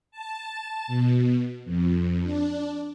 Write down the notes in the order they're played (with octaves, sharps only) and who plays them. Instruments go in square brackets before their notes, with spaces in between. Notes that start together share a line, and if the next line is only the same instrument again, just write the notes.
[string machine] A5
B2
F2
D4